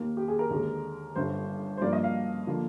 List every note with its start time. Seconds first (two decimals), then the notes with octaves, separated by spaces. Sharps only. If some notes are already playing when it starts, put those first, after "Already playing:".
Already playing: D#2 D#3 A#3
0.17 G4
0.28 G#4
0.39 A#4
0.50 D#2 D3 G#3
1.15 G1 G2 D3 C5
1.77 C5
1.81 G2 F3 A#3 D5
1.93 D#5
2.04 F5
2.47 D3 F3 A#3